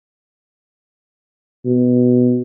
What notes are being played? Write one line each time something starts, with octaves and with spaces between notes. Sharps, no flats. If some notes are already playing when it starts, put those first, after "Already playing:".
B2